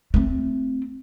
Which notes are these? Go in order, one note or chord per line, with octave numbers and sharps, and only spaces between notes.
A3 C4